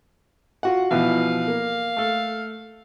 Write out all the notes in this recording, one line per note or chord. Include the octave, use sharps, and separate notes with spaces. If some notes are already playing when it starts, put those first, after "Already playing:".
F4 F#4 F#5
B2 E3 F3 F5
A#3
A3 A4